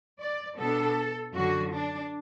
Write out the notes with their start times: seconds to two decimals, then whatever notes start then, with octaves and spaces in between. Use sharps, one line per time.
0.20 D5
0.58 B2 B3 D4 A4
1.34 F#2 D3 F#3 F#4
1.73 D4